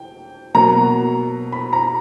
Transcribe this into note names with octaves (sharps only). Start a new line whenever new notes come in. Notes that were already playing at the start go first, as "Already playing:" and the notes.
Already playing: G5
B2 F#3 A#3 A#5
B5
A#5